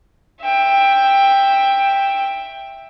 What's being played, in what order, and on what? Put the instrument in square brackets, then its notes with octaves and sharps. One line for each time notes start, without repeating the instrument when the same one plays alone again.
[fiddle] E5 G5